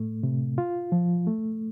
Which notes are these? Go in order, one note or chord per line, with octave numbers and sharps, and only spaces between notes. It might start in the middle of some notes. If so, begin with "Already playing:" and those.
Already playing: A2 A3
C3
F4
F3
A3